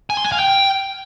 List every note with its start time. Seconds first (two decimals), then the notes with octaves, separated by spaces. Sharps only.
0.10 G#5
0.17 C6
0.25 G#5
0.32 F5
0.39 G5